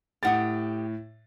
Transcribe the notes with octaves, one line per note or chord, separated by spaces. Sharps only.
A2 G4 F#5 D#6 A6